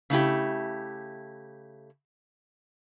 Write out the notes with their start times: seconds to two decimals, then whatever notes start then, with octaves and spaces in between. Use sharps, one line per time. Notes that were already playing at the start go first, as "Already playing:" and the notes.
0.10 C#3 A3 E4 G4